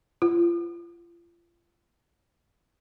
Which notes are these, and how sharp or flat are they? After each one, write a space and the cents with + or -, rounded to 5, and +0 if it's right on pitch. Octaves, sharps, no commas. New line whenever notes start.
F4 -35